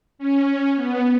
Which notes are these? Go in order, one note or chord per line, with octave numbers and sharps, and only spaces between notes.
C#4
B3